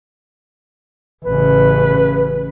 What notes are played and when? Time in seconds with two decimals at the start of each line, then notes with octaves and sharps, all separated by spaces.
1.24 A1 C#3 B4